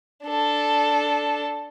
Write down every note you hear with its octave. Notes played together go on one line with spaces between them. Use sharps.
D4 A4